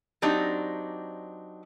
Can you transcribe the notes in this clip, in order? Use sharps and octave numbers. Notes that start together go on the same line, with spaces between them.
F#3 C4 D4 D#4 G4